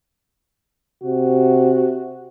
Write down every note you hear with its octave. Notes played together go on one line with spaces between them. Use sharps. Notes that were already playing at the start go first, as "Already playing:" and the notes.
C3 F#4